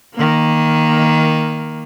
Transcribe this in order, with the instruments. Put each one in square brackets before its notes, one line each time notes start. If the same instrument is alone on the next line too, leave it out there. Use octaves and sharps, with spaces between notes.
[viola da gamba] D#3 A#3